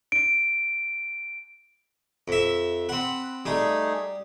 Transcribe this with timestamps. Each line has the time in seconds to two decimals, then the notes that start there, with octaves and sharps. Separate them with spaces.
0.12 D7
2.28 F2 E5
2.89 C4 F#5 B5 F#6
3.46 G3 A3 D#4 G#4 D#6